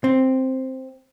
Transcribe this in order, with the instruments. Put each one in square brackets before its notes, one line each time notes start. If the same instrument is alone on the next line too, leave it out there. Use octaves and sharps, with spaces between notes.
[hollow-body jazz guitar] C4